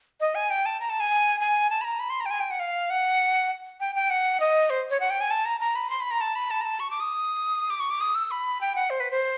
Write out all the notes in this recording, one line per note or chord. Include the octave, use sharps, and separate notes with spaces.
D#5
G#5
G5
A5
A#5
A5
G#5
G#5
A5
B5
A#5
B5
C6
A#5
G5
G#5
G5
F#5
F5
F#5
G5
G5
F#5
D#5
C5
C#5
F#5
G5
G#5
A5
A#5
A#5
B5
C6
B5
A#5
A5
B5
A5
A#5
A5
C#6
D6
D#6
D6
C#6
D6
D#6
E6
B5
G5
F#5
C5
B4
C5